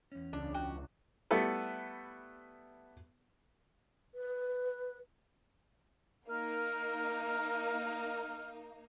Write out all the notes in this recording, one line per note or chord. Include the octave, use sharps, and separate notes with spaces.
E2 C#4
C#2 D4
F#4 G5
G3 A3 B3 E4 A4 B4
B4
A#3 D#4 A#4 F6